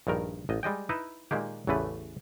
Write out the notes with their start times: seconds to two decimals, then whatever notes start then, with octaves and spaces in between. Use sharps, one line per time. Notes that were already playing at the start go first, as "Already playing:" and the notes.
0.07 A#1 G2 D#3 A#4
0.49 A1 D#5
0.63 G3 G#3 D#5 G5
0.89 D#4 E4 B4 D#5 E5
1.31 A#2 D#3 G#3 A#3 G4
1.67 A1 E2 C#3 E3 A3 B4